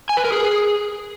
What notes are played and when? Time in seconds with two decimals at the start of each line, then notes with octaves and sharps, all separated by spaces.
0.09 G#5
0.17 B4
0.25 A#4
0.32 G#4